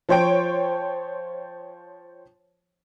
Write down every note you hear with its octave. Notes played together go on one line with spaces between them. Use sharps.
F3 C5 C#5 G5 D7